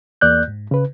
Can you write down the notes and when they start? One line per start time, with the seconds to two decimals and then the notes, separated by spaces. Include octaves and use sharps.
0.21 E2 A#3 D5 F#6 G6
0.48 G#2
0.71 C#3 B4